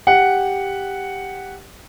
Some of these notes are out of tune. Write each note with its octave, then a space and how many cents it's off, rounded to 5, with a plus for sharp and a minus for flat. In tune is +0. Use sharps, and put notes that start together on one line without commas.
G4 +5 F#5 +0